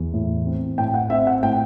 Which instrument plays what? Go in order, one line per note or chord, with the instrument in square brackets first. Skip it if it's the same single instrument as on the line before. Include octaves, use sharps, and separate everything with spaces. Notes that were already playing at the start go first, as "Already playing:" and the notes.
Already playing: [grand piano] E2
A2
C4
A2 G5
F#5
C4 E5
F#5
A2 G5